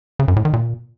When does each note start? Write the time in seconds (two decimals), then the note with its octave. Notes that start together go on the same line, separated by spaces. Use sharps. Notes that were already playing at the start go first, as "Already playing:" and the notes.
0.19 C#3
0.28 F#2
0.36 A2
0.45 D#3
0.53 A#2